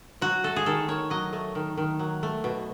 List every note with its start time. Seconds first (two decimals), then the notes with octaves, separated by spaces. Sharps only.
0.21 F#3 F#4
0.44 A3 A4
0.56 G#4
0.66 D#3 A4
0.88 D#3 C#5
1.10 F#3 D#5
1.33 A3
1.55 D#3
1.78 D#3
1.99 F#3
2.23 A3
2.44 B2